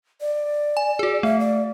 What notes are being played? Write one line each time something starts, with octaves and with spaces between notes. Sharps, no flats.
D5
G#5
F#4 G#4
A3 E5
D5